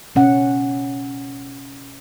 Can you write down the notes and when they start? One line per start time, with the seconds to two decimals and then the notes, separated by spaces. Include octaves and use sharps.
0.15 B2 C#4 F#5